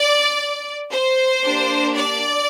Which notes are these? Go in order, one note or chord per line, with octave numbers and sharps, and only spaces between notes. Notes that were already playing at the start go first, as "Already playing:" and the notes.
Already playing: D5
C5
A#3 D4 G4
D5